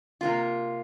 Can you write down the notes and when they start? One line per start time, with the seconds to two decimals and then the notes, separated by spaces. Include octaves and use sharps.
0.21 C3 A#3 F4